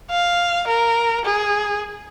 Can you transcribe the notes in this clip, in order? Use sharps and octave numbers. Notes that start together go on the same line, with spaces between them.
F5
A#4
G#4